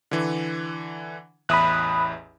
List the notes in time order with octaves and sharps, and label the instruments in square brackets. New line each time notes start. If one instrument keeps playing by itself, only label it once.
[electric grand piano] D3 E3
[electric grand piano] A1 E2 E5 [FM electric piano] B5 D#6 F#6